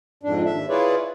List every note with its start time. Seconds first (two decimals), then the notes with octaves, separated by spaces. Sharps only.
0.23 F2 G#2 D4
0.45 D#2 E5
0.69 E4 F4 G#4 B4 C#5 D5